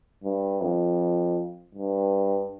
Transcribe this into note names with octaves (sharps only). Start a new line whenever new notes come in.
G2
F2
G2